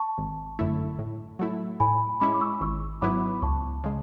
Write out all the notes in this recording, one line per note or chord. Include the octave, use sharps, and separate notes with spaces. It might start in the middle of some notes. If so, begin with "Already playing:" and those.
Already playing: A5 C#6
G#1
F#2 D3 A3 E4
A2
F#3 A3 E4
A2 G#5 B5
G#3 C#4 E4 B5 D6
D6
C#6 E6
G#1 C#6 E6
G#2 F#3 B3 E4 B5 D6
C#2 A5 C#6
C#3 G#3